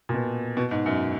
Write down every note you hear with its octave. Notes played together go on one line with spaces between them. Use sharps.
A#2
B2
B2
G#2
F#2